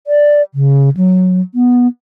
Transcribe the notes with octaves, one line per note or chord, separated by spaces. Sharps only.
D5
C#3
F#3
B3